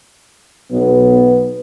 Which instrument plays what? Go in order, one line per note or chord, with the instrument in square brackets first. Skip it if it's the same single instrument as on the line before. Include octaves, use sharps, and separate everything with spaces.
[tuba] B1 [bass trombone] B3